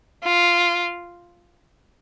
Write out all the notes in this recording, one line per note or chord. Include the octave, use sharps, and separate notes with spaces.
F4